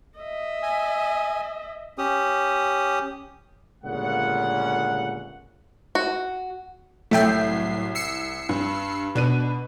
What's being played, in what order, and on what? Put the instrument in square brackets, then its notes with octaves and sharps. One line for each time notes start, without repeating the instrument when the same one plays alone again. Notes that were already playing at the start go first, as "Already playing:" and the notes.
[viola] D#5 E5
[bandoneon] G#5
C#4 G4 D#6
[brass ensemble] G1 A#2 C#3 G#3 F#5
[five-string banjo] F#4
[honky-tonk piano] C2 [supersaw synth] A2 F#3 C7 [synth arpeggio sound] A3 E5 G5
[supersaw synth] E6 C7 C#7
[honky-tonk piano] G2
[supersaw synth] B2 [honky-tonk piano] D4 B4 D#7